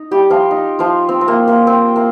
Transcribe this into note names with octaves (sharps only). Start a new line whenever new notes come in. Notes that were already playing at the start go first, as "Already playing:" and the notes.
Already playing: D#4
G3 G4
F3 F4
D#4
F3 F4
C4
C4
A#3
A#3
C4
A#3